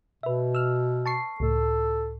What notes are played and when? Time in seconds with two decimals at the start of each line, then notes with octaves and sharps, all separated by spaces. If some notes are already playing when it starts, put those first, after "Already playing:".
0.23 B2 B4 E5
0.55 E6 F6
1.06 A5 C#6 C7
1.40 C#2 A2 A4